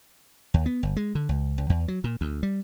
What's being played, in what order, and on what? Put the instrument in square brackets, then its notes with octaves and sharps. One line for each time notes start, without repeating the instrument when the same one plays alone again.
[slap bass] D#2
B3
G1
G#3
D3
C#2
C#2
E2
F#3
A#2
D2
G3